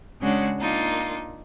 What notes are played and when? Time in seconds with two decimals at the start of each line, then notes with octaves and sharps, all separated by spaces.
0.20 C#3 G#3 C#4 D4 F#4
0.58 A#3 D4 D#4 F4